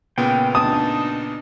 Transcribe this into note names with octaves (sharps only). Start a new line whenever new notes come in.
A#2 C#3 B3 G5
D4 D#4 A5 D#6